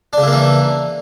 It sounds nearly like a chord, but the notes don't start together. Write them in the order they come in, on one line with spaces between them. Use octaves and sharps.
D4 C#3 E4 A#3 E3